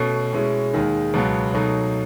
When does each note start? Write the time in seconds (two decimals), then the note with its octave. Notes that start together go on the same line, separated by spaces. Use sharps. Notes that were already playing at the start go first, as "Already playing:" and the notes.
Already playing: B2 A3 C#4
0.33 B2 G#3 C#4 E4
0.74 D#2 D#3 G#3 D#4
1.14 C#2 B2 F#3 B3
1.54 B2 F#3 A3 D#4